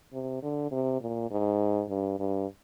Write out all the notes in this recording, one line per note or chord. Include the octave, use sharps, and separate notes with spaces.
C3
D3
C3
A#2
G#2
G2
G2